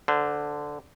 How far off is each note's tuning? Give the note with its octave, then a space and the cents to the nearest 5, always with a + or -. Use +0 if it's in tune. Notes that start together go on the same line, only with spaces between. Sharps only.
D3 +0 C5 -25